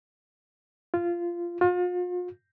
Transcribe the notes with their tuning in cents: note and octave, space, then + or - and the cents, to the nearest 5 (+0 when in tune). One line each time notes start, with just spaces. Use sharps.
F4 -15
F4 +40